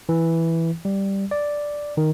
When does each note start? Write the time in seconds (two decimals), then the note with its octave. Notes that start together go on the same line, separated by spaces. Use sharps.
0.09 E3
0.85 G3
1.31 D5
1.97 D#3